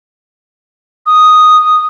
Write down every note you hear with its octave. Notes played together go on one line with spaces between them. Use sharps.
D#6